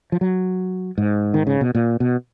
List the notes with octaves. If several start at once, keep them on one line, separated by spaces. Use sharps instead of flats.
F3
F#3
G#2
D#3
C#3
B2
A#2
B2